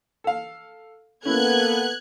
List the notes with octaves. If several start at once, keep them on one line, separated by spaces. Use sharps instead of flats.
A4 F5
A#3 B3 C#4 E4 A4 F#6 G#6